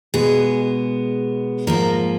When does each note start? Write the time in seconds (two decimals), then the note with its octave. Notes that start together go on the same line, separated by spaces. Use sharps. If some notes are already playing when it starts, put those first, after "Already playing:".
0.14 B2 G#3 B3 G#4
1.67 G#2 F3 A#3 A#4